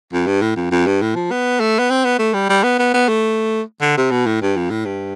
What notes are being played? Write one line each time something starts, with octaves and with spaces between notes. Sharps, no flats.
F2
G2
A2
F2
F2
G2
A2
F3
B3
A3
B3
C4
B3
A3
G3
G3
B3
B3
B3
A3
D3
C3
B2
A2
G2
F2
A2
G2